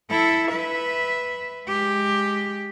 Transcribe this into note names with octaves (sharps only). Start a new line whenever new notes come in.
E4 A4
B4 E5
G#3 G4